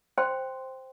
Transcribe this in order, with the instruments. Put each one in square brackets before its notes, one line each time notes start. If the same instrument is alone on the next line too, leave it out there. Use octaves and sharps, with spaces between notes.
[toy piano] C5 G5 C6